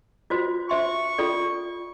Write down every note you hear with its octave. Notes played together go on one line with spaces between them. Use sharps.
F4 F#4 C5
C5 E5 C6 C#6
F4 A4 D5